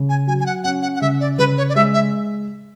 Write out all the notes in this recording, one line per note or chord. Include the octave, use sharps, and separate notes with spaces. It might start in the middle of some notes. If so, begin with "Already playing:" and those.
Already playing: C#3
G#5
F#3 G#5
G#5
F#5
C#4 F#5
F#5
F#5
C#3 E5
D5
C#3 B4
C#5
D5
G#3 E5
E5